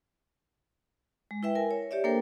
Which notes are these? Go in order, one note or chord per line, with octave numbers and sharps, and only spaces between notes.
G#3
E4 B4 E5 G5
A#4 G#5
C#5
G4 C#5 D5 E5
A#3 D4 A4 A#4 C5 G5